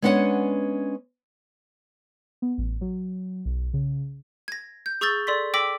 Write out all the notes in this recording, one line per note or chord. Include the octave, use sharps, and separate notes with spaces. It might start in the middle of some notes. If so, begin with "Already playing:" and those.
G#3 B3 C#4 D4 E4 F#5
B3
A1
F#3
B1
C#3
G#6 A#6
G6
G#4 C#6 E6 G6 A6 G7
A4 D5 C6 B6
G5 D6 E6 A#6 B6 F#7